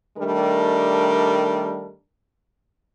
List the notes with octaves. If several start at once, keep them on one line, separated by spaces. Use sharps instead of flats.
D#3 G3 A3 D4 A#4